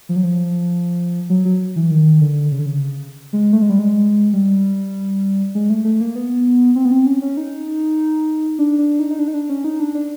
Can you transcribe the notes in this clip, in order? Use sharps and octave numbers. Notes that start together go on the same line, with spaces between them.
F3
F#3
F3
F#3
F#3
E3
D#3
D3
C#3
D3
C#3
G#3
A3
G#3
G3
G#3
G3
G#3
A3
A3
A#3
B3
C4
B3
C4
C#4
C#4
D#4
D4
D4
D#4
D#4
D4
D#4
D4
C#4
D#4
D4
D4